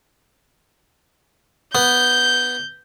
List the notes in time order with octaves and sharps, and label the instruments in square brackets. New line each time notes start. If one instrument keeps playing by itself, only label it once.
[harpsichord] B3 [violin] G6